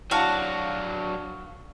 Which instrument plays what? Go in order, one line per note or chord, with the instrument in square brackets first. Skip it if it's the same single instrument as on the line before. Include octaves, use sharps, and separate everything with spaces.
[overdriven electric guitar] F#3 D4 [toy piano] E4 A5 [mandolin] F#4 F5